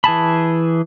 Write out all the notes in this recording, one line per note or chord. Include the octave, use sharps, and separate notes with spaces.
E3 G#4 A5 B5